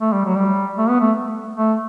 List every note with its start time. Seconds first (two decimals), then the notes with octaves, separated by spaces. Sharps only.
0.01 A3
0.13 G3
0.25 F#3
0.37 G3
0.78 A3
0.89 B3
1.00 A3
1.55 A3